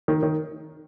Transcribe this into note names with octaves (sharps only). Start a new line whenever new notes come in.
D#3
D#3